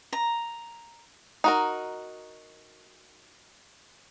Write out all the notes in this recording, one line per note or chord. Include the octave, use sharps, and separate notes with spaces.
A#5
D#4 F#4 A#4